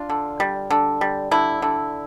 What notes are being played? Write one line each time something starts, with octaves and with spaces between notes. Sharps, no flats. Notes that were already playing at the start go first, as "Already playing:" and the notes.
Already playing: D4 F4
D3
G3
D3
G3
D3 E4
D3